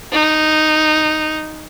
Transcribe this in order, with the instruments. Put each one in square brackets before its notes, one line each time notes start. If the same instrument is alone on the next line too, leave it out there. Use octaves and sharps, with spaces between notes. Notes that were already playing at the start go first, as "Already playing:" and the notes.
[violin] D#4